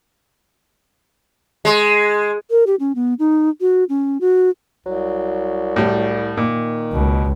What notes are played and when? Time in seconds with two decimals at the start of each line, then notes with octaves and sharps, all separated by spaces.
1.65 G#3
2.51 A#4
2.67 G4
2.80 C#4
2.95 B3
3.19 D#4
3.61 F#4
3.89 C#4
4.21 F#4
4.86 C2 F#3
5.76 A2 G3
6.37 A#2 D#3
6.93 C#2 B2